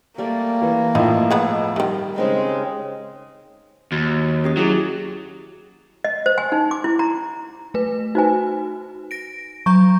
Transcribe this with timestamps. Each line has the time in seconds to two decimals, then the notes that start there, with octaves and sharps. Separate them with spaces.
0.18 G3 A3 A#3 D5
0.62 E3
0.95 A2 F3 D#4 F4 C#5 D#5
1.30 G#3 B3 B5
1.76 D#3 E3 G3 D#5
2.16 C#3 G#3 C4 D#4
3.92 D#2 F#4
4.44 C#4 G4 D#6
4.57 F#3 E4 F#4 G#4
6.04 D#5
6.26 C5
6.38 G#5
6.52 D#4
6.71 D6
6.84 E4
6.99 A#5
7.74 A3 B4
8.15 D#4 F#4 B4 C5 G#5
9.11 A#6 D7
9.66 F#3 A#5 C#6 G6